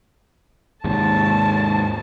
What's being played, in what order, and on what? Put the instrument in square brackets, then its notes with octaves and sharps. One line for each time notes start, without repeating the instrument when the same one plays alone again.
[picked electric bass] D#2 G#2 C3 [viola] A5